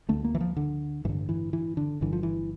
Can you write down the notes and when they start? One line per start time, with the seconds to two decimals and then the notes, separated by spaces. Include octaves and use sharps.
0.09 D2 D3 A3
0.24 A#3
0.35 E3
0.41 F3
0.56 D3
1.05 A1 G2 D3 E3
1.29 E3
1.53 E3
1.77 D3
2.01 G1 G2 D3 E3
2.13 F3
2.23 E3